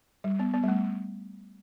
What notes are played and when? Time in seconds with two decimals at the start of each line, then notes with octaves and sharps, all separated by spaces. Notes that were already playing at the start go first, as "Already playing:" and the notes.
0.24 G3
0.39 B3
0.54 B3
0.64 G3
0.68 A3